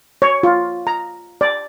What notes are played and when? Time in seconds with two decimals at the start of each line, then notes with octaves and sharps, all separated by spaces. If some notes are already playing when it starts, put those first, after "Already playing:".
0.22 C#5
0.43 F4
0.87 A#5
1.41 D5